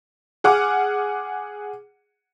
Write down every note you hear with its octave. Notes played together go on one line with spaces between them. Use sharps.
G#4 F#5 D6 F6